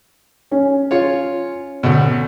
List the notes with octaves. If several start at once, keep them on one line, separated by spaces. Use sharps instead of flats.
C#4
F4 C#5
D2 B2